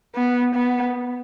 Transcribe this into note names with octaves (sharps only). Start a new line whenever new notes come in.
B3
B3